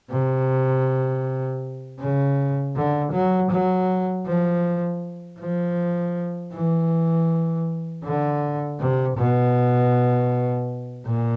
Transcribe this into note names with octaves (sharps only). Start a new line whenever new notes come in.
C3
C#3
D3
F#3
F#3
F3
F3
E3
D3
C3
B2
A#2